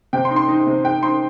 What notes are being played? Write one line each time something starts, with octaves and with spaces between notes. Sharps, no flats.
C3 G5
C6
D#4
C6
D#4
C3
D#4 G5
D#4 C6